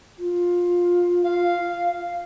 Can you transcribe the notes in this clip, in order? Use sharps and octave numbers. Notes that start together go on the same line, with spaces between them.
F4
F5